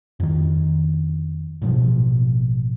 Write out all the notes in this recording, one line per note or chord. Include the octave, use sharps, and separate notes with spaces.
F2 D#3
A1 G2 B2 F3